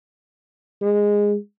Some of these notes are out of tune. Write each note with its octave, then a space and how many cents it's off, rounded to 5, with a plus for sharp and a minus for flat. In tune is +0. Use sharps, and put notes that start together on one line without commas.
G#3 -10